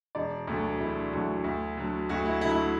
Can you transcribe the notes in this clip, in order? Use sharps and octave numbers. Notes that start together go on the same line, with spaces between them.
E1 D5
D2 D3 F#3
E1 E4
D2 D3 F#3
D2
D3 F#3
D2 F#4
E4
D3 F#3 E4
E4
F#4